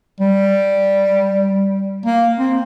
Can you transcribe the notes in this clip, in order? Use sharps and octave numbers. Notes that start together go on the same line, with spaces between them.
G3
A#3
C4